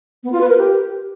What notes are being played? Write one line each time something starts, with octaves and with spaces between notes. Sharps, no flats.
B3
F4
B4
A#4
G4